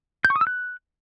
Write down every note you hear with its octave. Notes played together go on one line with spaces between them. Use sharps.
G6
C#6
D#6
E6
F#6